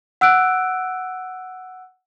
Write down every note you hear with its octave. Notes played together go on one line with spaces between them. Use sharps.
F#5 E6 F#6 D7